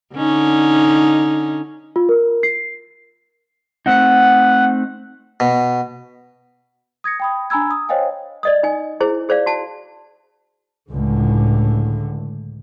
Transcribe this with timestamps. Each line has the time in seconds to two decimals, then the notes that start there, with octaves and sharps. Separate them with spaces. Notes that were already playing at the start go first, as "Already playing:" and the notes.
0.15 D3 C#4 D#4
1.96 F4
2.09 A#4
2.43 C7
3.86 A3 C4 D#4 F#5
5.40 B2
7.04 D#6 G#6 A#6 C#7
7.20 G5 B5 D#6
7.50 D4 G#5 A#5 B5 E6 G#6
7.71 D#6
7.89 C5 C#5 D#5 F5 G5 G#5
8.43 D5 D#5 D#6
8.63 D#4 G#5
9.00 E4 G#4 C5
9.29 G#4 C5 D5 F5
9.46 F#4 A5
10.92 C#2 A2 D3